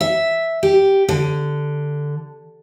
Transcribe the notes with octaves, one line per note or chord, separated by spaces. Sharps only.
E5
G4
D3